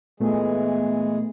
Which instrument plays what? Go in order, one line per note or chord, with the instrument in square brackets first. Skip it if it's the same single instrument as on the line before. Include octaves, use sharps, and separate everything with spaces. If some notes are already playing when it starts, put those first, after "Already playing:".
[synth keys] A#2 A3 B3 [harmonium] E3 G#3 G#4